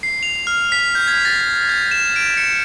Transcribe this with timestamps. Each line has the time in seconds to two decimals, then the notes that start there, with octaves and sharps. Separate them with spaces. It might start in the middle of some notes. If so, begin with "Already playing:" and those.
0.03 C7
0.23 F7
0.47 F6
0.72 B6
0.95 G6
1.08 G#6
1.25 A6
1.69 G6
1.91 E7
2.16 D7
2.37 C#7